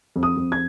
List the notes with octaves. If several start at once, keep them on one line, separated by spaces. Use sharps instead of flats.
F2
D#6
F2
G#6